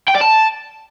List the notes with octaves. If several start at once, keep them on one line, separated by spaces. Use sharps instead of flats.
G5
D5
A5